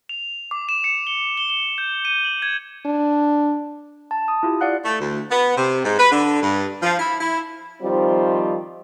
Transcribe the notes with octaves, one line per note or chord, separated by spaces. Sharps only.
F7
D6
E7
C#7
G7
G7
G7
G6
D#7
F#7
G#6
D4
A5
D#6
E4 F4 G4
E4 D5 F5 F#5 F#6
A3
D2
B3
C3
G#2
B4
D3
G2
F3
E4
E4
D#3 F3 G3 C4 D#4 F4